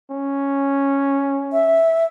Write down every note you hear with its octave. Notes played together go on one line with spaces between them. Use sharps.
C#4
E5